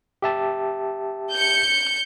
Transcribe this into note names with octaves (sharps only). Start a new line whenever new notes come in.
G4 E5 A5
G6 C#7